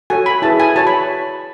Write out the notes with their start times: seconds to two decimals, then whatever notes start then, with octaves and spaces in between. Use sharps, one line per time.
0.10 F#4 A4 C#5 G#5
0.26 B5
0.42 E4 G#4 B4 A5
0.60 G#5
0.76 F#4 C#5 A5
0.87 B5